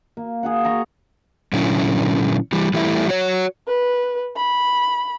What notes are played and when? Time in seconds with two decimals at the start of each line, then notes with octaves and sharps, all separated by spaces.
0.17 A#3
0.43 G#4 F5 F#5
0.65 A#5 C#6
1.53 A#2 D3 F#3 C#4 E4
2.53 E3 G3
2.74 E3 G3 A3 E4
3.09 F#4 C#5
3.67 B4
4.36 B5